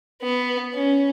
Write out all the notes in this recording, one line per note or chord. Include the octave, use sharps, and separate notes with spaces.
B3
C#4